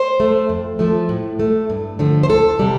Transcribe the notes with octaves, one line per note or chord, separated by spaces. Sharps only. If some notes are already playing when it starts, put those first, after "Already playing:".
Already playing: C5
A3
F2
F3 A3
A2
A3
G2
D3 F3 A3
C5
D2 A4
C3 G3